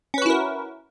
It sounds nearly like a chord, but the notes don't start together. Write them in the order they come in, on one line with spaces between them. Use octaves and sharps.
C#4 B4 F#4 E4 A#4